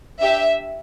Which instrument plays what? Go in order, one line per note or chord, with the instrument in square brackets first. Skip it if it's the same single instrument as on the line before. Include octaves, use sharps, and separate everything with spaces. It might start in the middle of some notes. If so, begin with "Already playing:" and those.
[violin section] D4 G4 E5